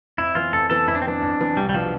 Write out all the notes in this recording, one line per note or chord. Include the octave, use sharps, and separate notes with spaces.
F2 E4
E3 B3 F4
F2 A4
E3 B3 A4
F2 E4
D4
C4
E3 B3 D4
F2
E3 B3
C2 G3
G3
B2 F3 B3 D4